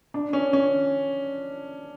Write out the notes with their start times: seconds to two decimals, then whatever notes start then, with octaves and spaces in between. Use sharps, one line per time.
0.14 D4
0.33 C#4
0.53 C#4